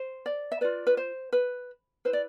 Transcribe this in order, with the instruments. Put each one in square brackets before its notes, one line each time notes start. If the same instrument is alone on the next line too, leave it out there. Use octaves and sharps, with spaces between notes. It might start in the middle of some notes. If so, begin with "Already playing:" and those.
Already playing: [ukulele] C5
D5
E5
F4 B4 D5
B4
C5
B4
E4 B4 C5
D5